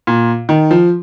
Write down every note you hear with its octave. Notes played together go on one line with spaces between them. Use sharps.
A#2
D#3
F3